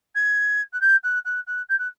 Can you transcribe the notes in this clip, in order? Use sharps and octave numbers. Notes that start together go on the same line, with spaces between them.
G#6
F#6
G6
F#6
F#6
F#6
G6
F#6